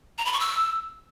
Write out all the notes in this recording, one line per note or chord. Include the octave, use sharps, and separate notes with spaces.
A#5
B5
C#6
E6